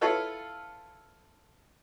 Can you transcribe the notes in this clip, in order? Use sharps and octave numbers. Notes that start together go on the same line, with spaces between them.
E4 F4 A4 B4 C#5 F5